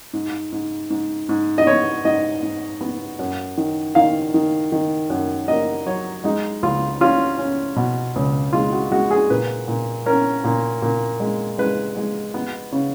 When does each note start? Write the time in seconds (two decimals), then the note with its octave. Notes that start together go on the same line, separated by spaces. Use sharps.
0.13 G#2
0.52 G#2
0.90 G#2
1.29 G#2
1.58 D#5
1.67 B3 C#5
2.05 G#2 D#5
2.43 G#2
2.81 B3
3.19 F#2
3.58 D#3
3.95 D#3 F5
4.34 D#3
4.72 D#3
5.10 F#2
5.48 A#3 D#5
5.86 F#3 C#5
6.24 G#3 D#4
6.63 C#2 F4
7.01 C#4 F4
7.39 C#4
7.76 B2
8.16 C#2
8.53 G#3 F4
8.73 F#4
8.92 G#3 F#4
9.11 G#4
9.30 A#2 B4
9.68 A#2
10.06 C#4 A#4
10.44 A#2
10.82 A#2
11.20 G#3
11.58 G#3 B4
11.97 G#3
12.34 B3
12.72 C#3